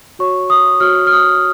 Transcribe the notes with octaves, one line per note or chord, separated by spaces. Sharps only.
F#4 C#5 C#6
D#6
F#4 C#5 F6
F6
D#6